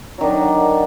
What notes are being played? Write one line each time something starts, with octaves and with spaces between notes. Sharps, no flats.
D3 D#3 F#3 D4